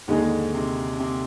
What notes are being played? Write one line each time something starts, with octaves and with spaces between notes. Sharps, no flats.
D#2 G#2 D3 G#3 D#4 G#4
C3
C3